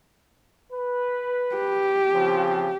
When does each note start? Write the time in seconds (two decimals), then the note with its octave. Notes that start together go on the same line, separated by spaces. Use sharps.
0.72 B4
1.55 G4
2.14 C#3 F3 C4